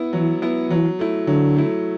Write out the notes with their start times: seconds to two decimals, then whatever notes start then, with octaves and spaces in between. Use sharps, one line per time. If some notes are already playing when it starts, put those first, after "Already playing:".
Already playing: B3 E4
0.13 E3 F#3
0.42 B3 E4
0.70 E3 F#3
0.99 A3 E4
1.27 D3 F#3
1.56 A3 E4